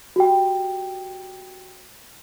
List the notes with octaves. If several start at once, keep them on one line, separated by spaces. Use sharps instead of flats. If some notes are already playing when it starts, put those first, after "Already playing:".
F#4 G4 G5